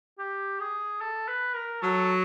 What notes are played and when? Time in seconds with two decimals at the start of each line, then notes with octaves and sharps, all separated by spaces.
0.19 G4
0.60 G#4
1.01 A4
1.28 B4
1.56 A#4
1.83 F#3 A4